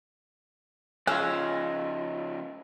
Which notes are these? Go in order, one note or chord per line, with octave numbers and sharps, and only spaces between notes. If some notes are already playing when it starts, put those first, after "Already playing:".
C#3 F3 C#4 F4 G#4 D#5 E6 F#6